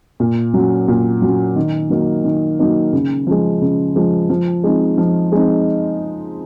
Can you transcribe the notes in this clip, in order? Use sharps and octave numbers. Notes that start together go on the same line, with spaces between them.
A#2
F#3 C#4
A#2
F#3
C#4
D#3
F#3 A#3 D#4
D#3
F#3 A#3 D#4
C#3
F3 G#3
C#3
F3 G#3
F3
G#3 C4 D#4
F3
G#3 C4 D#4